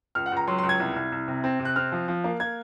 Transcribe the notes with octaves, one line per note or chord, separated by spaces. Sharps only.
C#2 F6
F#5
C#2 A#5
F#3 C6
C6
C#2
G#6
C2
C2
C2
C3
C4
C3
F#6
C4 F6
F3
F3
A#3
A#3 G#6